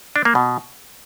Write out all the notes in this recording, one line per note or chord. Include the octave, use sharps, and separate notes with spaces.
D4
A#3
B2